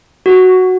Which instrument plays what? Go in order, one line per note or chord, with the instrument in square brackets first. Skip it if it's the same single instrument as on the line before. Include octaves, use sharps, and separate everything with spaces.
[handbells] F#4